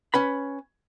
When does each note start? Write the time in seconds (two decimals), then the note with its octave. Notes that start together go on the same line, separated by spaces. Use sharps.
0.14 C#4 B4 B5